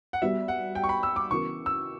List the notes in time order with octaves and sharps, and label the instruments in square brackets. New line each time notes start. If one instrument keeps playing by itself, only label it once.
[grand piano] F#5
[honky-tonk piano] G3 B3 F#4 [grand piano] E5
[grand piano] F#5
G5
C#6
B5
E6
D6
[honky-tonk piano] C#3 E3 B3 F#4 A#4 [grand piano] C#6
[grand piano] E6